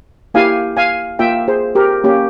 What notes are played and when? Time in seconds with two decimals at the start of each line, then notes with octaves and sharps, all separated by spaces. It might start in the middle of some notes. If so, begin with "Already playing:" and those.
0.34 A#3 E4 G4 F5 G#5
0.77 F5 G#5
1.19 A#3 F4 E5 G5
1.48 G#4 C5
1.75 G4 A#4
2.04 A#3 C#4 G4